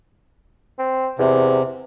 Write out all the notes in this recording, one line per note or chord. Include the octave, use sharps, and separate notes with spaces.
C4
E2 C3